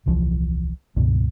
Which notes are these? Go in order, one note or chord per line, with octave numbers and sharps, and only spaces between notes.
D#1 C2 E3 F3
C#2 G2 B2 D#3